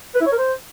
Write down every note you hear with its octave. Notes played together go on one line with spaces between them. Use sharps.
B4
E4
C#5
A#4
C5